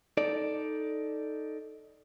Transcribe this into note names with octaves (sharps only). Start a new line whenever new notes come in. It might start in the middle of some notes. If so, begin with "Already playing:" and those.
D#4 A4 D5